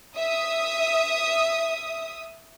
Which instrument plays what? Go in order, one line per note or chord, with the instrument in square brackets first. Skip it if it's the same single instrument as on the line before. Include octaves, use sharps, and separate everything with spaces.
[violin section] E5 D#6